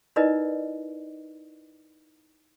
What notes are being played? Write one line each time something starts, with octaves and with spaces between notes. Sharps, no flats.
D#4 E4 A#4 B4 D5 D#5